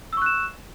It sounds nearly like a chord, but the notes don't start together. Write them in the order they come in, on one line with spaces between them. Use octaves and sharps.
E6 C#6 F#6 E7